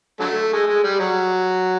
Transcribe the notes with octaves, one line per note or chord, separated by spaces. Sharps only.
D3 F#3 A3
G#3
G#3
G3
F#3